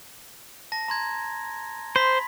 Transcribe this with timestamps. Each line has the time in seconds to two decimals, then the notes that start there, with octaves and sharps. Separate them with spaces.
0.72 A5 A#6
0.88 A#5 C6 G#6
1.96 C5 B5 C6 B6